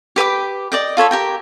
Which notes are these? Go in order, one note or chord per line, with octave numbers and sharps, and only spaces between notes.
G4 B4 G5 D6
D5 D#5 G5
F4 A4 C#5 B5
G4 A#4 G5